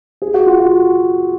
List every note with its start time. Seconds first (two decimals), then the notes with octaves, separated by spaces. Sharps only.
0.22 G#4
0.34 F#4
0.46 F4
0.59 F#4